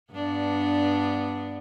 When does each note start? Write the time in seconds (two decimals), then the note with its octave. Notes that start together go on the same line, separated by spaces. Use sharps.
0.12 G2 B3 D4